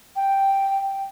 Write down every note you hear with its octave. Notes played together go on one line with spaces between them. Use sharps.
G5